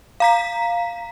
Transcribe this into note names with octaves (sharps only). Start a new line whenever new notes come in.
F5 A#5 B6